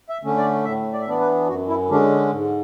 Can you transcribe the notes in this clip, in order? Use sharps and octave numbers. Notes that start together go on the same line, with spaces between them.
E5
D3 A3 C#4
D5
A2 E5
D5
E5
E3 B3 D4 D5
B4
F#2 F#4
E4
D3 G#3 C#4 D4
G#2